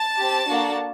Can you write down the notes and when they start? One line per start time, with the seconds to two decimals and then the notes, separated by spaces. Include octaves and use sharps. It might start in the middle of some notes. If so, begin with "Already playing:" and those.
Already playing: A5
0.19 C4 G4
0.47 A#3 D4 F#4 A4